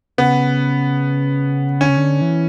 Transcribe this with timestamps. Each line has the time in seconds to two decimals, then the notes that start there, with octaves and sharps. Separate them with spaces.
0.18 C#3 B3
1.81 D3 C#4
1.89 C#3
1.97 D3
2.22 E3